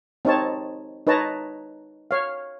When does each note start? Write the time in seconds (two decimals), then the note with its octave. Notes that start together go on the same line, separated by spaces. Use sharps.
0.25 C4 D#4 C#5 A5
1.07 D#4 B4 C#5 A5 A#5
2.11 C#5 F5